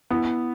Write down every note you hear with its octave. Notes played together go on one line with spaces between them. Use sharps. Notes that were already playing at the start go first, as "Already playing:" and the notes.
B3 E4